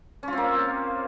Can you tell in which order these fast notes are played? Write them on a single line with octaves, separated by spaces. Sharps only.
C#4 F4 C4 A#3